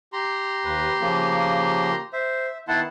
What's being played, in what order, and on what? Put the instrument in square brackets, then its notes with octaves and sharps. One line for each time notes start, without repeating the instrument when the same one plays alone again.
[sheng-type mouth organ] G4 A#5 C6
[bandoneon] D#2 B4
C#3 F3 A#3
[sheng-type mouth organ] C5 [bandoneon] E5
[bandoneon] D#3 B3 C6 [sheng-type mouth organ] E4 F#5 A5